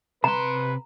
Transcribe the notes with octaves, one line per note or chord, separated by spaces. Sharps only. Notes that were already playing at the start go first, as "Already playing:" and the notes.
C3 B4 A#5 C6